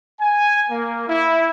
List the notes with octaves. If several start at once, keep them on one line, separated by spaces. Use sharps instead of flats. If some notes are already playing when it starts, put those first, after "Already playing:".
G#5
A#3
E4